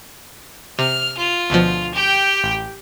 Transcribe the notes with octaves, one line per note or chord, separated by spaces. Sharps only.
C3 F6
F4
D2 B2 F3
G4 G5
A1